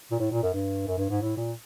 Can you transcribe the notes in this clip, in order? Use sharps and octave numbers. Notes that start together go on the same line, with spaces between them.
A#2
A2
A#2
F#2
G2
F#2
G2
G#2
A2
A#2